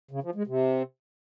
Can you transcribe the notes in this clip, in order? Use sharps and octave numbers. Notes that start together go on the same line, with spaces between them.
C#3
F3
G#3
C3